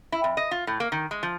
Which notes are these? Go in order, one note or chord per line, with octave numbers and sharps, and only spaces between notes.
E4
F2
D#5
F4
A2
A#3
D#3
G#3
F3